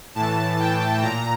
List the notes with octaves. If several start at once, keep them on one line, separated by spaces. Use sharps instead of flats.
A2 E3 A5
G5
A#2 A#5